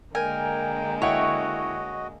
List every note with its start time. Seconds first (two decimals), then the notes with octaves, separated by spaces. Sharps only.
0.15 D3 G#3 A#3 A#4 G5 G#5
1.02 E4 F#4 C#5 D#5 F#5 G5